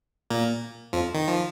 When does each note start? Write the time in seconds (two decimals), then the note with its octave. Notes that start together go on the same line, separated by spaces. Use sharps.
0.30 A#2 A#3
0.93 F2 F3
1.15 D#3
1.28 F3